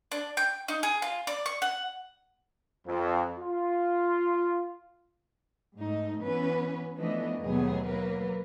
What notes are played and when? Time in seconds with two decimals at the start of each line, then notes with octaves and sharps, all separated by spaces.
0.12 D4
0.37 G5
0.68 D#4
0.83 G#4
1.02 F4
1.27 D5
1.46 C#6
1.62 F#5
2.87 F2
3.38 F4
5.77 G#2 A3 D#4
6.21 E3 B3 C#4 B4
6.95 E3 F3 A3 B3 D4 D#5
7.41 D#2 B2 F#3 A3 B3 G#4
7.87 F#3 A#3 A#4 B4